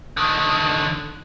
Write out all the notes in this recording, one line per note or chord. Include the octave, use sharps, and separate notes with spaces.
D3 D#3